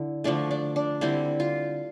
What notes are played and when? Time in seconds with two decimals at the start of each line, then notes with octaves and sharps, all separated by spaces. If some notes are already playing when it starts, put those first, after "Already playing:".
Already playing: D3 E4
0.24 D3 F3 A3 D4
0.51 D4
0.76 D4
1.01 D3 G3 C4 E4
1.40 F4